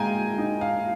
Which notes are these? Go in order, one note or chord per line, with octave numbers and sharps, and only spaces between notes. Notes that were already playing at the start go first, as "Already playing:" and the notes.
Already playing: A#2 G#3 F5 G5 G#5 A#5 G6
D#4
F5